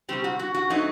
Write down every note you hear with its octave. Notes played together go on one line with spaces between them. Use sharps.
C3 G3 C4 G4
F#4
F#4
F#4
F#3 A3 C4 D#4